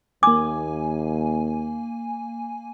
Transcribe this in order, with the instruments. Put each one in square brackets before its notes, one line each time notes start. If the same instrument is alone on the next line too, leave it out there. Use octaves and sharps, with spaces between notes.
[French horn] D#2 [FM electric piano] A#3 G#5 [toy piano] D6